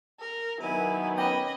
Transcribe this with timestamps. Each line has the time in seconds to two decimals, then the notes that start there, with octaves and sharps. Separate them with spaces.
0.20 A#4
0.61 D#3 F#3 B3 E4 A#4 G#5
1.17 C#4 D#5 F#5 G5 B5 D6